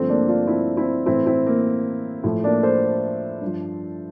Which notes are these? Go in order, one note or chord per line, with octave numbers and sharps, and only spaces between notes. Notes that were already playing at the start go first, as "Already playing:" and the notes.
Already playing: G2 D3 F3 A3 C4
A#3 D4
D4 F4
C4 E4
C4 E4
A2 E3 C4 E4
C4 E4
A#3
A2 F3
A#3 D4
A4 C5
G2 F3